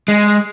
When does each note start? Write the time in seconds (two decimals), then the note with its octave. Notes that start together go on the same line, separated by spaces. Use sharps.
0.08 G#3